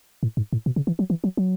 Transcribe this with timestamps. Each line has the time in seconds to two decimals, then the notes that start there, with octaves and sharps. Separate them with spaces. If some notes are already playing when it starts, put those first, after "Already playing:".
0.23 A2
0.37 G#2
0.53 A2
0.66 B2
0.76 C#3
0.87 E3
0.99 F#3
1.10 E3
1.24 F#3
1.37 F#3